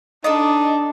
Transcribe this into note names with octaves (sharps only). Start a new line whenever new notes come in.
D4 D#4 A4 D5 D#5 D#6